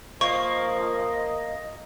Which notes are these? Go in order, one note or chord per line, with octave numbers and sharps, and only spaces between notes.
F3 A#3 D#5 C#6